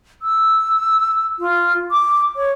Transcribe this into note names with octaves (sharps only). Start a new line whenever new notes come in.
E6
F4
D6
C#5